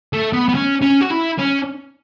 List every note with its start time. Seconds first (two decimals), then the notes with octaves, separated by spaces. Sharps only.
0.13 A3
0.33 B3
0.49 B3
0.55 C#4
0.82 C#4
1.01 F#4
1.11 E4
1.39 C#4